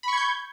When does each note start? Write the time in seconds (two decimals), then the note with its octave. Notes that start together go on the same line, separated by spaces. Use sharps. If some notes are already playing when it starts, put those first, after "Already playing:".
0.03 B5
0.08 C#6
0.13 G#6
0.17 G6